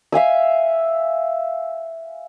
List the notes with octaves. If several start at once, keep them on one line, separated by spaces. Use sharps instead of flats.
E5 F5 G#5 E6